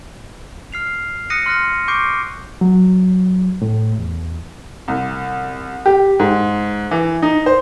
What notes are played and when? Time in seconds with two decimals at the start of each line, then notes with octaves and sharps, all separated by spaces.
0.72 F6 C7 F7
1.30 D#6 F#6 A#6 C#7 D#7
1.46 C6 F6 F#6 A#6
1.88 C#6 D6 G6 C7 D7
2.61 F#3
3.62 A2
3.99 E2
4.88 C2
5.86 G4
6.19 G#2
6.91 E3
7.22 D#4
7.46 C5